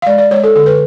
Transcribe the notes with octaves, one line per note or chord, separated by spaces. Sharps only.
F5
G#3 D5
D5
G#3 C#5
A4
D3 A4
B4